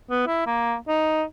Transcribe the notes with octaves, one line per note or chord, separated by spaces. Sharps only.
B3
E4
A#3
D#4